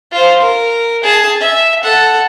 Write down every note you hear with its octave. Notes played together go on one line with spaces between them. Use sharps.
F4 C5
A#4
G#4 A5
E5
A4 F#5